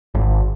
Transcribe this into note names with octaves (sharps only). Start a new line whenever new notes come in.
G#1